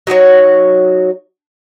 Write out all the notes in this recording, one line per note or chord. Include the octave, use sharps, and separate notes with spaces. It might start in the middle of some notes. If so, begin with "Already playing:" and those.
F#3 D#4 F#4 C#5